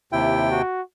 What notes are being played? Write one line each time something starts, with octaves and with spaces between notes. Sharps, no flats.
D#2 C3 E4 G5
F#4